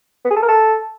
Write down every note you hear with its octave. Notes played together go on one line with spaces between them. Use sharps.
B3
G#4
A4
A#4
A4